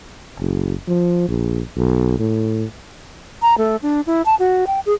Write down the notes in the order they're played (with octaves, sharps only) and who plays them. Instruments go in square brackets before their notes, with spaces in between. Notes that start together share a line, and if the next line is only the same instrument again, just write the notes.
[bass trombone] F#1
F3
A#1
B1
A2
[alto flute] A#5
A3
D4
E4
A5
F#4
G5
G#4